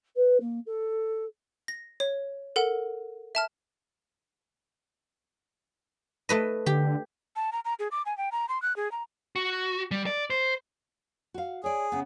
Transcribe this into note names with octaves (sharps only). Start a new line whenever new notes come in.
B4
A#3
A4
A#6
C#5
A4 A#4 F#5
E5 A5 F6
A3 B4 D#5
D3 G4
A5
A#5
A#5
G#4
D6
G#5
G5
A#5
C6
F#6
G#4
A#5
F#4
G3
D5
C5
F#4 F5
G#4 C#5 D5
C#3 B3